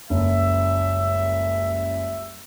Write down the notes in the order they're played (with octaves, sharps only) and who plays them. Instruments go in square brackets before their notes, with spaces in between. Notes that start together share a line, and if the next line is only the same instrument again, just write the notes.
[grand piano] F#1 [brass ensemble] C#2 G3 E5